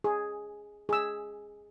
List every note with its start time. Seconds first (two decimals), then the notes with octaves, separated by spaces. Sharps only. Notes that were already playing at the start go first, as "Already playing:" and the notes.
0.04 G#4
0.89 G#4 E6